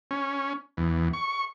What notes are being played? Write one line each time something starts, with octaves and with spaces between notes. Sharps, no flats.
C#4
E2
C#6